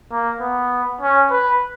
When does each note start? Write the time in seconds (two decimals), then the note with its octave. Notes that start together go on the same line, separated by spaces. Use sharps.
0.12 A#3
0.41 B3
1.01 C#4
1.31 B4